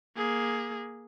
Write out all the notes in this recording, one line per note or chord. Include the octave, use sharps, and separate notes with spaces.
A#3 G#4